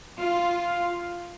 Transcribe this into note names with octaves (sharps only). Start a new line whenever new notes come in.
F4